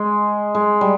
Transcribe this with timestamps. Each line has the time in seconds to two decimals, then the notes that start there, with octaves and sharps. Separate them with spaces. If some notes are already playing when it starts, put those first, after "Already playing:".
Already playing: G#3
0.55 G#3
0.81 G3